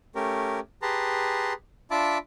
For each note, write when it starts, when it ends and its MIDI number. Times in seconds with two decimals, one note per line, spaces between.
0.15 0.60 57
0.15 0.60 61
0.15 0.60 67
0.15 0.60 70
0.82 1.53 67
0.82 1.53 68
0.82 1.53 71
0.82 1.53 81
0.82 1.53 82
0.82 1.53 84
1.91 2.18 62
1.91 2.18 65
1.91 2.18 76
1.91 2.18 81
1.91 2.18 83
1.91 2.18 86